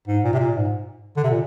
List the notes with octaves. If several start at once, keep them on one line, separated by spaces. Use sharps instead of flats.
G#2
A#2
C3
A#2
G#2
D3
C3
A#2